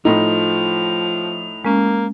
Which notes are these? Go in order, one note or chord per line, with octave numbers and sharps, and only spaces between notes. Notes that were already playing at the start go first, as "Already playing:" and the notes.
A2 F3 D#4 F7
G#3 A#3 C#4